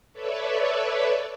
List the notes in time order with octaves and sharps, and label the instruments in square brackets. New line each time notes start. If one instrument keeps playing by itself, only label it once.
[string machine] A4 B4 C#5 D5 E5